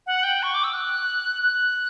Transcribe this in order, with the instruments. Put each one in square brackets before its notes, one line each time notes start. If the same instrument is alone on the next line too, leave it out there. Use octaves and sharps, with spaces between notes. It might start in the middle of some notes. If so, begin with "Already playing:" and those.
[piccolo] F#5
G5
C#6
D6
E6
F#6
F#6